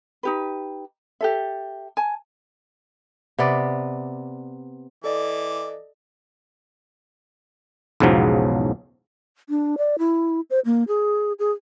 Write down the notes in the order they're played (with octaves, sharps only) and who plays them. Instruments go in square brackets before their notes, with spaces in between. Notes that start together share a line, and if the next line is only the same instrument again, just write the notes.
[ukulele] D#4 G4 B4
G4 A4 E5
G#5 A5
[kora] C3 B3 D5
[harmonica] E3 D6 [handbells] A4 D5 D#5
[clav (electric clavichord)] B1 E2 G#2 C#3 F3 F#3
[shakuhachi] D4
D5
E4
C5
A#3
G#4
G#4